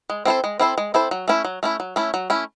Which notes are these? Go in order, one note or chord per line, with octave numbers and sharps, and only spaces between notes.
G#3
C4 E4 A4 C5
G#3
C4 E4 A4 C5
G#3
C4 E4 A4 C5
F#3
A3 C#4 E4
F#3
A3 C#4 E4
F#3
A3 C#4 E4
F#3
A3 C#4 E4